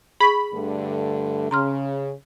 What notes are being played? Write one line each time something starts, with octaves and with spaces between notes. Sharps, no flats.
G#4 B5 C#6
G2 D3 A3
C#3 A#5 C6 F6